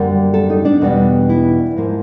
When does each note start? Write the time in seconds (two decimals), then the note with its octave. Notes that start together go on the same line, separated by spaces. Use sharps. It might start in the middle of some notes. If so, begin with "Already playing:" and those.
Already playing: F#2 D3 G3 A#3
0.34 A4
0.50 D#4
0.65 D4
0.81 E2 B2 G3 B3 D4 D#4
1.29 E4
1.76 G#2 F3 A#3